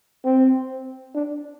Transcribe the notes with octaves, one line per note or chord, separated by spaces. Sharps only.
C4
D4